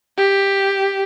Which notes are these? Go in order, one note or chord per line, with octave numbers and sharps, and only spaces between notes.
G4